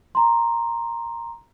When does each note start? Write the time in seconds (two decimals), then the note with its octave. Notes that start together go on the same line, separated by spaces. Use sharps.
0.15 A#5 C6